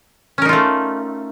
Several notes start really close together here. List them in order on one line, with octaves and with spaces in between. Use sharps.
C#4 A#4 D#4 F4 A3